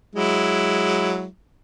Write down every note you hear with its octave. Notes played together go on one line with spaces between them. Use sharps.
F#3 G#3 E4